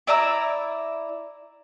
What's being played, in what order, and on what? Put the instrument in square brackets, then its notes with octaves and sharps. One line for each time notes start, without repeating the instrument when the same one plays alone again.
[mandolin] E4 D5 A#5 E6